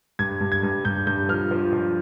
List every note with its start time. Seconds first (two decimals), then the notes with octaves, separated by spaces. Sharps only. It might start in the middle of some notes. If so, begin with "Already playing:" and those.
0.19 G2 G#6
0.41 G2
0.52 G#6
0.63 G2
0.85 G2 G6
1.07 G2 G6
1.29 F3 F6
1.51 F3
1.73 F3